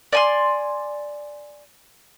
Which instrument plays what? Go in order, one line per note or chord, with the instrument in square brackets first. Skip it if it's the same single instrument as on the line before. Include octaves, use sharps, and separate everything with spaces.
[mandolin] D5 G#5 C6